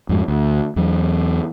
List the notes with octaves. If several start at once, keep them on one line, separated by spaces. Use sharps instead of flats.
F2 G#2
D2
E2 F#3